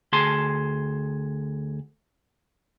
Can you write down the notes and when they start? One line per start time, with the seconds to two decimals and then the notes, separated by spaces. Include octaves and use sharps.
0.13 D2 G#4 A5 C6